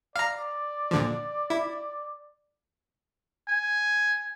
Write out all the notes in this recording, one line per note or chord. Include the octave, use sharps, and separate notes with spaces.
D5 F5 A#5
A#2 D3 F3
E4
G#5